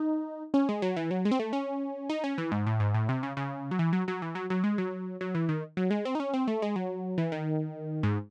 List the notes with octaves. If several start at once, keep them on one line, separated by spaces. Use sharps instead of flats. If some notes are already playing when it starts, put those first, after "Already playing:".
Already playing: D#4
C#4
G#3
F#3
E3
F#3
G#3
C4
A3
C#4
D#4
C#4
E3
G#2
A2
G#2
A2
C3
C#3
C#3
F#3
E3
F#3
F#3
E3
F#3
F#3
G#3
F#3
F#3
E3
D#3
F#3
G#3
C4
D#4
C#4
C4
A3
G#3
F#3
E3
D#3
G#2